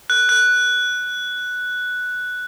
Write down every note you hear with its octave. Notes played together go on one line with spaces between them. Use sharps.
F#6
F#6